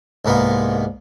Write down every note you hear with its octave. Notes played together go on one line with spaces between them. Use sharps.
C2 G#2 A#3 B3